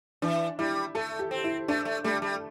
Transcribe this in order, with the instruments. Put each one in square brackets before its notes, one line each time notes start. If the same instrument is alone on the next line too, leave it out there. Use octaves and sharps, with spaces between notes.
[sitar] E3 [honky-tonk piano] D4
[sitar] G3 [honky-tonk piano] E4
[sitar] A3 [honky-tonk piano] A4
[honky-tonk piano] G4
[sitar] C4
[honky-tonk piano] E4
[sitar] A3 [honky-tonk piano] D4
[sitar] A3
[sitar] G3 [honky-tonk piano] A3
[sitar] G3